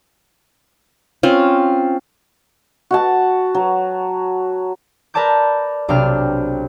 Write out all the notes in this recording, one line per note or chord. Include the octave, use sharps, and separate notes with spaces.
C4 C#4 F4
F#4 F#5 A5
F#3
A#4 B4 D5 A5 D6 G6
B1 C3 D4 G5 F6